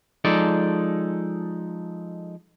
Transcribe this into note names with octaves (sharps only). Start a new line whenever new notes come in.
F3 G#3 D#4 A4 D5